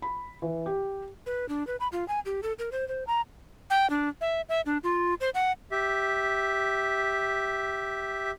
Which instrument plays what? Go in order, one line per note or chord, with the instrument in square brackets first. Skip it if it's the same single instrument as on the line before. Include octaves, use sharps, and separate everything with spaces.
[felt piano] B5
E3
G4
[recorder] B4
D4
B4
B5
F4
G#5
G4
A4
A#4
C5
C5
A#5
G5
D4
E5
E5
D4
F4
C5
F#5
[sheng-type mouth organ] G4 E5